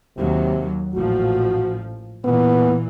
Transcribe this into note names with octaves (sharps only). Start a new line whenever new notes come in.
D#2 C3 F#3
A1 A#2 F3 F#4
A#2 E3 B3